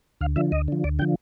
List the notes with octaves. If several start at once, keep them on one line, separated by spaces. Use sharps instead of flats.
D2 F5
D3 F3 E5
D2 D#5
D3 F3
D2 D5
D3 F3 G5